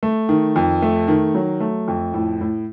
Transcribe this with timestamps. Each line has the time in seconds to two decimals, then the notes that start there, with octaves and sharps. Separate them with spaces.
0.03 A3
0.29 D#3
0.56 F2
0.82 A3
1.08 D#3
1.35 F#3
1.60 A3
1.88 F2
2.14 A2
2.41 A2